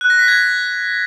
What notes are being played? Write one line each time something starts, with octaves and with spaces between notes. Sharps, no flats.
F#6
A#6
B6
G#6